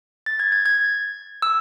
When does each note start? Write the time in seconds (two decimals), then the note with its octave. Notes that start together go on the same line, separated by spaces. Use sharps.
0.26 A6
0.40 G#6
0.52 G#6
0.66 G#6
1.42 E6